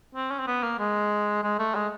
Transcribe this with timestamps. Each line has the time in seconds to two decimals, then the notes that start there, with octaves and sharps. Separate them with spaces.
0.15 C4
0.31 C#4
0.39 C4
0.47 B3
0.63 A#3
0.79 G#3
1.43 G#3
1.59 A3
1.75 G#3